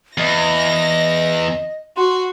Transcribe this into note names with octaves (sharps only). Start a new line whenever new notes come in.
E2 D#5 A#6
F#4 C6